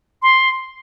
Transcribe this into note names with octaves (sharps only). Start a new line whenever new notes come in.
C6